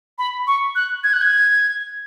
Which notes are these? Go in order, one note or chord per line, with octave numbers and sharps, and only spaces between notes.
B5
C#6
F#6
G#6
F#6
G#6